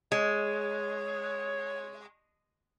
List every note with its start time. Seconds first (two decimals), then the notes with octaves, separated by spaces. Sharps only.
0.12 G#3 C#5